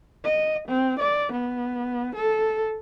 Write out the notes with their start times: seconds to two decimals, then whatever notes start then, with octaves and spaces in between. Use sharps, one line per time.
0.25 D#5
0.68 C4
0.99 D5
1.32 B3
2.16 A4